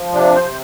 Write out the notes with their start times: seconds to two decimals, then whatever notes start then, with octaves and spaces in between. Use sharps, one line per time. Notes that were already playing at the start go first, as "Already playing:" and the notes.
Already playing: F3
0.13 C3 D4
0.36 C5
0.43 C3